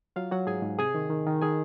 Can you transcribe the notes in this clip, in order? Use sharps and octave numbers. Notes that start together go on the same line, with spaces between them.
F#3 F4 F5
F#3 F#4 F#5
G#2 G#4 G#5
G#2
C3 G#4 G#5
D#3
D#3
D#3
D#3 G#4 G#5